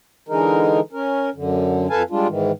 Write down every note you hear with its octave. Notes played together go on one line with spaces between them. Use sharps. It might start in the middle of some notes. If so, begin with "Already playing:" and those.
D3 E3 G#3 D#4 A#4
C#4 A#4
F#2 D3
F2 A4 B4 F5 G#5 A5
G3 G#3 D4 F4
G#2 D#3 E3